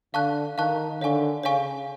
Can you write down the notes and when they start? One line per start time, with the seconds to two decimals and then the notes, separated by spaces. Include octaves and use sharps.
0.14 D3 F5 A5 C#6 F#6
0.57 D#3 F5 A5 C#6 F#6
1.01 D3 C#5 F5 G#5 C#6
1.43 C#3 C#5 F5 G#5 C#6